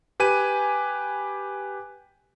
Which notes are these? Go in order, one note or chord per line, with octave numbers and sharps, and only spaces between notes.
G4 B4 G#5 D#7